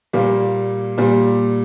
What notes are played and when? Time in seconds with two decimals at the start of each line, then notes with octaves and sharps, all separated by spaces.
0.13 A#2 G3 A#3
0.98 A#2 G3 A#3